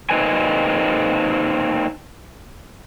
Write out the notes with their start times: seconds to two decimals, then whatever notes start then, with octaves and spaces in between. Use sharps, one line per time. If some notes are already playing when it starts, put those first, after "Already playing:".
0.10 A#3 C4 D#4 B4 G#5